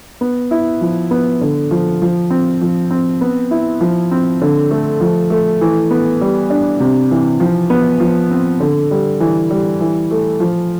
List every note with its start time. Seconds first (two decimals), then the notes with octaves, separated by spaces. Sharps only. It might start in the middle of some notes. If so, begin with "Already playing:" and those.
0.21 B3
0.51 E4
0.81 F3
1.11 B3
1.41 D3
1.71 F3
2.02 F3
2.30 C4
2.61 F3
2.91 C4
3.21 B3
3.51 E4
3.81 F3
4.11 C4
4.41 D3
4.71 A3
5.01 F3
5.30 A3
5.61 E3
5.91 B3
6.21 G3
6.50 D4
6.80 C3
7.11 E3
7.40 F3
7.70 B3
8.00 F3
8.31 C4
8.60 D3
8.91 G3
9.20 E3
9.51 G3
9.81 E3
10.11 A3
10.40 F3